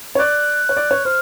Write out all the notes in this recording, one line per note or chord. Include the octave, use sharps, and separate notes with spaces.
C#5
D5 F#6
C#5
D5
C#5
C5 F6